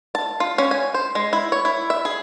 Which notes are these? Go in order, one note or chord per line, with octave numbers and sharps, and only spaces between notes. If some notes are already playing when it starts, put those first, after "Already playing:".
A5
F4
C#4
G#5
C5
G#3
E4
C#5
E4
E5
G#4